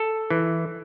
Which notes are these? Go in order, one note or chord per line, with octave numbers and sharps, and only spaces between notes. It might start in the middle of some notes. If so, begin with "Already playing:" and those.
Already playing: A4
E3